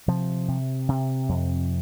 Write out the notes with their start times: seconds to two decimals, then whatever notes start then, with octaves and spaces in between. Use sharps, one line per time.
0.08 C3 F3
0.48 C3
0.89 C3
1.29 F2